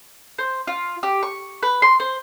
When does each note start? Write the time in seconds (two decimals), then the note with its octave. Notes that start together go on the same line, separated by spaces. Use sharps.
0.38 C5
0.67 F4
1.03 G4
1.23 C#6
1.63 B4
1.82 C6
2.00 C5